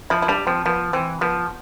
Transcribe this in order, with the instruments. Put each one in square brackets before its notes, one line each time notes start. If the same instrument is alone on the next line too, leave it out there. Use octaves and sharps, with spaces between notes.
[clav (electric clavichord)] F3 [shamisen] E4
[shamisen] E4
[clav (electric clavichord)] G3 [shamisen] D4
[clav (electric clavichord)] F3 [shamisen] C4
[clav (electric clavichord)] F3 [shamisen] B3
[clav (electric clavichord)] E3 [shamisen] C4
[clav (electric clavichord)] F3 [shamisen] B3